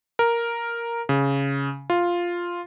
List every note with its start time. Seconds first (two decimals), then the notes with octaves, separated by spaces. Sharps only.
0.19 A#4
1.09 C#3
1.90 F4